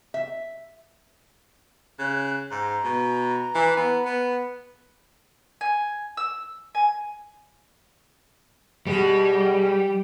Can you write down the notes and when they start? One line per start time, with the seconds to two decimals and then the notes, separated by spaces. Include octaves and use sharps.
0.14 E5
1.99 C#3 F#6
2.51 G#2 A#5
2.84 B2
3.55 E3
3.77 B3
4.05 B3
5.61 G#5
6.17 E6
6.75 G#5
8.87 B2 G3 G#3 G#4